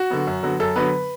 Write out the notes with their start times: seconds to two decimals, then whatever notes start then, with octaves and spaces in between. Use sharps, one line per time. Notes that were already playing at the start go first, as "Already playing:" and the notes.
Already playing: F#4
0.10 D3 F#3 B3
0.27 F#2
0.43 D3 F#3 B3
0.60 F#2 A4
0.76 D3 F#3 B3 B4